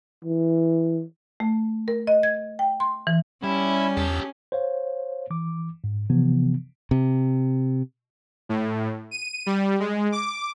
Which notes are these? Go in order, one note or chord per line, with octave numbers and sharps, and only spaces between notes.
E3
A3
A#4
D#5
G#6
G5
C6
E3
G3 C#4 E4
E2 G4 A4
C5 C#5 F5
E3 D6
G#2
C3 E3 F3 B3
C3
A2
D#7
G3
G#3
D6